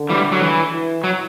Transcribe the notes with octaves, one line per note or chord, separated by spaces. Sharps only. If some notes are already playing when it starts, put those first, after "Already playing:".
Already playing: D3
E3 G3
F#3
E3
E3
F#3